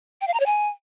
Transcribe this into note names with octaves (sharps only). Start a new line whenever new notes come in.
G5
F5
A#5
C#5
G#5